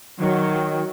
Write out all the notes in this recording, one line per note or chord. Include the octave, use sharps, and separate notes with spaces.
D#3 F#3